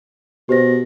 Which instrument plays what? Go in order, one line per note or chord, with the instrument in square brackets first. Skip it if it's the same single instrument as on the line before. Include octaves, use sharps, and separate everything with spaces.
[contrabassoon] B2 [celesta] G4 C5 A#6